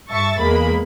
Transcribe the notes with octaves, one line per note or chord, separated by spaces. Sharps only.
G2 E5 A5 C#6 A6
E2 G#3 A#3 B5